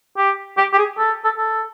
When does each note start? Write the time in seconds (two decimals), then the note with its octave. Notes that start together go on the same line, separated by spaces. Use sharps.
0.17 G4
0.57 G4
0.73 G4
0.78 G#4
0.98 A4
1.24 A4
1.38 A4